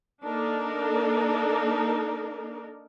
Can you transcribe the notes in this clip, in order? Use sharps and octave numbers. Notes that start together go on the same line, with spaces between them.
A#3 D4 D#4 A4 A#4